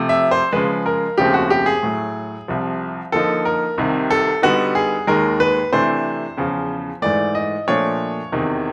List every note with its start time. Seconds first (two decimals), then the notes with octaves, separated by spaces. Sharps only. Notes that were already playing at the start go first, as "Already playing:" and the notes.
Already playing: C3 F3 A3
0.09 E5
0.31 C5
0.52 C#3 F3 G#3 B4
0.86 A#4
1.18 D#2 C#3 F3 A3 C4 G4
1.34 F#4
1.50 G4
1.66 G#4
1.83 A2 F#3 A3
2.48 C2 C3 F3
3.12 D3 F3 A#3 D#4 A4
3.45 A#4
3.78 C2 C3 D#3
4.10 A4
4.42 D3 G3 B3 D#4 F#4
4.75 G#4
5.07 D#2 D#3 G#3 A#4
5.40 B4
5.72 C3 E3 A3 D4 C5
6.37 E2 C#3 F3
7.02 G#2 E3 A3 D5
7.35 D#5
7.68 A#2 F3 A3 D4 C#5
8.32 E2 C3 D#3